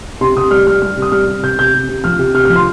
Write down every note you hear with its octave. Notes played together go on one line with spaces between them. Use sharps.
C3 C6
C3 D#6
G3 F6
G3 F6
G3 F6
C3
D#6
G3 F6
C3
C3 G6
C3 G6
C3
C3
F3 F6
C3
C3 F6
F6
F3
C6